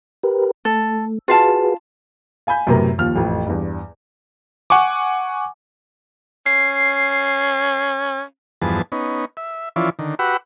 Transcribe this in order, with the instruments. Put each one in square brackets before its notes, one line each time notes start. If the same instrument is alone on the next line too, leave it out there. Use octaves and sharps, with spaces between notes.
[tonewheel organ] G4 A#4 B4
[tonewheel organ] A3 [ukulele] A4
[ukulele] F4 F5 A5 [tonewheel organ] F#4 G#4 B4
[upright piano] F5 G#5 B5 G6
F#2 A2 C3 B3 A#4 A#5
D#2 F3 F6
A1 F2
E2 G2
[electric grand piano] F#5 G#5 C#6 D6
[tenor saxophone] C#4 [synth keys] C7
[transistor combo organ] E2 G2 F3 B3 G#4 A5
B3 C#4 D#4
E5
E3 F3 C#4 E4 F4 D5
D3 D#3
F#4 G4 B4 F#5 B5 E6